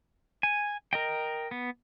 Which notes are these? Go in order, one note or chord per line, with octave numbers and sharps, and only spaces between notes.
G#5
A#4 D#5 G5
B3